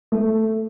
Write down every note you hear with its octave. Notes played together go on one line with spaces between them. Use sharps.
A3